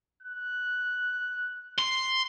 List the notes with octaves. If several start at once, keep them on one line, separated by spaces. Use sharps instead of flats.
F#6
C6